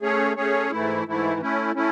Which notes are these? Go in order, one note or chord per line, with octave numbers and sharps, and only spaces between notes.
A3 C#4 G#4 C#5
A3 C#4 G#4 C#5
G#2 E3 A3 E4
G#2 E3 A3 E4
A3 C#4 E4
A3 C#4 E4